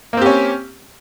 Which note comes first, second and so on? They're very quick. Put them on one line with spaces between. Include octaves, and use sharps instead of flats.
A#3 C4 G4 C#4